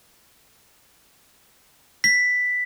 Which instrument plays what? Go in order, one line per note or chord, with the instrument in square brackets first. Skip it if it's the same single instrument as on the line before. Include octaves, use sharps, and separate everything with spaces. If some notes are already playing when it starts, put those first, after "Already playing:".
[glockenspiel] B6